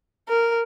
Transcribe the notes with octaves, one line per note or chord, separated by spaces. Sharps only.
A#4